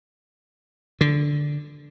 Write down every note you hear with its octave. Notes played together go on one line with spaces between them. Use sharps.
D3